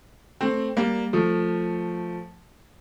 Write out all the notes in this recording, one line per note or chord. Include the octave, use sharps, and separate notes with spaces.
A3 C4
G3 A#3
F3 A3